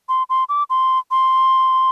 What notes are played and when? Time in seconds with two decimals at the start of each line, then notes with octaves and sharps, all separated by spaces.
0.09 C6
0.30 C6
0.49 D6
0.70 C6
1.11 C6